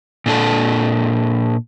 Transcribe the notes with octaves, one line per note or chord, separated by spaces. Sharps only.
A#2 D4 A4